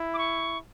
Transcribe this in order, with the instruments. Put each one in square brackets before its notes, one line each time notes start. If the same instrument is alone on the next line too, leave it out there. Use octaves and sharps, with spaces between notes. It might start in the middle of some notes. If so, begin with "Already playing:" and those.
Already playing: [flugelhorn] E4
[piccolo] D6
C#6